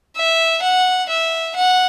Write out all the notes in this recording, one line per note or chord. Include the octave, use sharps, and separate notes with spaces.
E5
F#5
E5
F#5